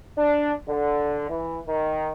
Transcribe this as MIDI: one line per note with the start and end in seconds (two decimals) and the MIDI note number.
0.17 0.51 62
0.68 1.28 50
1.29 1.58 52
1.67 2.12 51